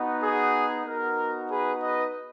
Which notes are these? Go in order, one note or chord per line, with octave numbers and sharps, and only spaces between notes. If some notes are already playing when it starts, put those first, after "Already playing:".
Already playing: B3 D#4 F#4
G#4
B3 D#4 F#4 A#4
G#4 B4
B4 D#5